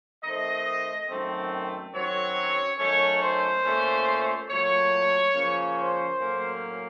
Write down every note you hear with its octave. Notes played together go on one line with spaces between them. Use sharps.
D#3 A3 C4 D#5
F#2 D#3 A3 C4
F#2 D#3 F#3 C4 C#5
D#3 F#3 A3 C#4 C#5
C5
A#2 A3 C#4
A#2 F#3 A3 C#5
C#3 F3 A#3 C#4
C5
A2 F#3 A#3 C#4